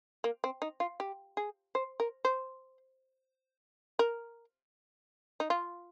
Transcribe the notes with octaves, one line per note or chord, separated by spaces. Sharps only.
A#3
C4
D#4
F4
G4
G#4
C5
A#4
C5
A#4
D#4
F4